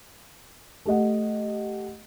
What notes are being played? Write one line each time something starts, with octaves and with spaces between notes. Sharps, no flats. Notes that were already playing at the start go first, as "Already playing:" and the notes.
A3 G4 D#5 F#5